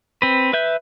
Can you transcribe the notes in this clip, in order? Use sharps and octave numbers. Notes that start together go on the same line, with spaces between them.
C4 B4
B4 E5 G6